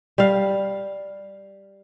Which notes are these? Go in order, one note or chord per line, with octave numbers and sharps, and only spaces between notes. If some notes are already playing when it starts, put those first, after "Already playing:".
G3 F5